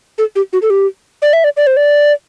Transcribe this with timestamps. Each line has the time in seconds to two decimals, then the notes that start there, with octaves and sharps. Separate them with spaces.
0.18 A4
0.36 G4
0.53 F#4
0.62 A4
0.70 G4
1.22 D5
1.33 E5
1.44 D5
1.57 D5
1.67 C5
1.77 D5